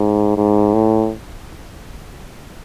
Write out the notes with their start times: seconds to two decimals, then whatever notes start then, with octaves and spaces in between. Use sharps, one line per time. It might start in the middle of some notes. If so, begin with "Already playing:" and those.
Already playing: G#2
0.37 G#2
0.73 A2